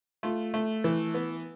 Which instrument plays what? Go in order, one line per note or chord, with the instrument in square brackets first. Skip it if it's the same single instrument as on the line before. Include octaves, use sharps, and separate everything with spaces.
[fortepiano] A3 F4
A3
E3
B3